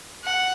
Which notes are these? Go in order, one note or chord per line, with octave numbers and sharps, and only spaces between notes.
F#5